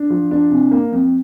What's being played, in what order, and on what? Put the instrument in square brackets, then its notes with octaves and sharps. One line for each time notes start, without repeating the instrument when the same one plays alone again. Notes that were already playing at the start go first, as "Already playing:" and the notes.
Already playing: [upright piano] D4
F3
D4
C3
A#3
F2